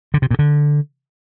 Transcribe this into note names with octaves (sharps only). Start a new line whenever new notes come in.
D3
C3
A#2
D3